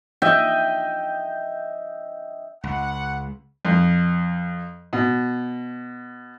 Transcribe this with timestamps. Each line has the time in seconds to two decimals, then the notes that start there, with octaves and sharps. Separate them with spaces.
0.22 D#5 E5 G5
2.64 C#2 F#5
3.65 F2
4.93 B2